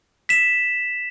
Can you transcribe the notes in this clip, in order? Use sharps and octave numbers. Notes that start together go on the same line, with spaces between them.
B6 E7